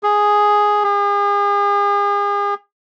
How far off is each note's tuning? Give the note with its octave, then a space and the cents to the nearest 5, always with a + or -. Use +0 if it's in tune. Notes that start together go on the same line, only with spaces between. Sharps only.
G#4 +0
G#4 -40